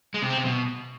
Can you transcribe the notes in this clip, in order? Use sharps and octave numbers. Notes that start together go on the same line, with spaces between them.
G#3
C3
C4
C3
B2